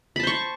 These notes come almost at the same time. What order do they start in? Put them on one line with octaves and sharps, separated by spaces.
B5 A5 C5 C#6